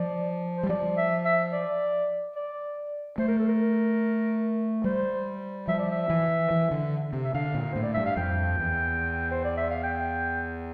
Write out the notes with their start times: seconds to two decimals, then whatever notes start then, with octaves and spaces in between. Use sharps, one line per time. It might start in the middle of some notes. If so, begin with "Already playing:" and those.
Already playing: F3 D5
0.57 C5
0.63 G3
0.69 F3 D5
0.97 E5
1.25 E5
1.52 D5
2.36 D5
3.18 A3 C5
3.28 A#4
3.39 A4
3.48 A#4
4.84 G3 C5
5.68 F3 E5
5.79 D5
5.91 E5
6.10 E3
6.51 E3
6.71 D3
7.13 C3
7.24 E5
7.34 D3 F5
7.54 A#2
7.72 A2 C5
7.83 D5
7.94 G2 E5
8.06 F5
8.17 F2 G5
8.59 E2
9.31 C5
9.44 D5
9.57 E5
9.70 F5
9.83 G5